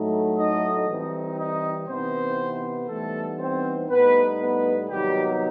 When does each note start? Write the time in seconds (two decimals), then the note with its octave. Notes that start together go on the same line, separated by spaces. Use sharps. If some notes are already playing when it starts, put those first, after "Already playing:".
Already playing: A2 F#3 A3 D#4
0.37 D#4 D#5
0.88 E3 G3 C4 D#4
1.38 D#4 D#5
1.88 C3 E3 B3 C4 D#4 C5
2.88 E3 G3 A3 B3 D#4 A4
3.39 C4 C5
3.89 A2 G3 B3 D#4 B4
4.39 B3 B4
4.89 C3 D#3 F#3 G3 B3 D#4 G4